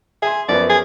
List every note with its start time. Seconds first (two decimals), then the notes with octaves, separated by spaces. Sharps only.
0.22 G#4 E5 G#5 C6
0.48 F#2 F3 B3 D5
0.69 G#4